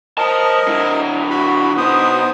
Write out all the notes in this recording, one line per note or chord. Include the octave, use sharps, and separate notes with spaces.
A#4 C5 D#5 A5
D3 E4
F#4 B5
B2 B3 D#4 C5 D#6